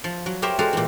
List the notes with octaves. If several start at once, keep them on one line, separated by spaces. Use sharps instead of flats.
F3
F#3
G4 A#4 C5 C#5 E5
G#3 F#4 G4 A4 F5
A#2 E3